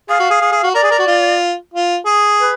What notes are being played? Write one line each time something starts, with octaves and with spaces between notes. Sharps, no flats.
G#4 F5
F#4
G#4
G#4
G#4
F#4
A#4 D5
G#4
A#4
F#4
F4
F4
G#4
B4